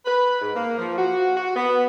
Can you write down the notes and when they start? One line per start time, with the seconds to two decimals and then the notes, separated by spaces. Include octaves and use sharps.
0.06 B4
0.40 G#2
0.55 A#3
0.78 F3
0.98 F#4
1.36 F#4
1.56 B3